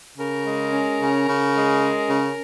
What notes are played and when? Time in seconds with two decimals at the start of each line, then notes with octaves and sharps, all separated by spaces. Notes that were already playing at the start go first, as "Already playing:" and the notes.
0.18 C#3 A#4
0.45 G#3
0.73 C#4
1.00 C#3
1.28 C#3
1.55 G#3
1.82 C#4
2.10 C#3